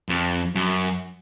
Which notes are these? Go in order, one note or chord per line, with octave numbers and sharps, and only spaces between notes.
F2
F#2